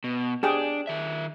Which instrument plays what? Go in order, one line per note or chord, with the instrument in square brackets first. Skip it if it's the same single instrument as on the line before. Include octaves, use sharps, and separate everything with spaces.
[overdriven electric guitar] B2
[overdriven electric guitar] D4 [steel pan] G4 G#4 G5
[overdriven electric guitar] D#3 E5